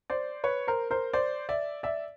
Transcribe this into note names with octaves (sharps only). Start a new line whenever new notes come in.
C5 D5
B4 C#5
A#4 C5
A#4 C5
C5 D5
D5 E5
D5 E5